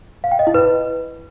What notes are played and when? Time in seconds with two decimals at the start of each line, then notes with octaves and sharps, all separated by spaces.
0.24 F5
0.31 G5
0.39 D#5
0.47 E4
0.54 B4